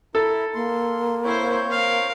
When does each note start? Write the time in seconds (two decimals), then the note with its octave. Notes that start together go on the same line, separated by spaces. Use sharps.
0.15 E4 A4 A#4
0.55 A#3 C6
1.24 C4 E4 C5 C#5 G6
1.71 A#4 F5